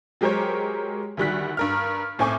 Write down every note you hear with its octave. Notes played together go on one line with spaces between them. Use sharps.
F#3 G#3 G4 A#4 C5 C#5
D2 D#3 G3 F#4 F#6 B6
G2 A#4 F6
B1 A2 C4 G#5 C#6 D6